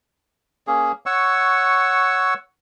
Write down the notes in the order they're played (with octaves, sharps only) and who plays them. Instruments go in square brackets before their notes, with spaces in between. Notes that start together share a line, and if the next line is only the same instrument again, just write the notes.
[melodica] A#3 C#4 G#4
C#5 F#5 C#6 E6